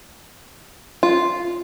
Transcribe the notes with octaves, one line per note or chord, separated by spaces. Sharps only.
F4